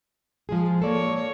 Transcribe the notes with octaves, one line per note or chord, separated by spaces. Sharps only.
F3 G#3 G#4
A#3 A4 C#5 D5